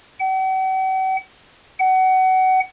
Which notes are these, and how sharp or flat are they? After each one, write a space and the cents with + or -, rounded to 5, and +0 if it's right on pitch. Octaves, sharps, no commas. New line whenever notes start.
F#5 +45
F#5 +25